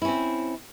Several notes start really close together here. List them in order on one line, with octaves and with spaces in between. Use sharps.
E4 C#4 C4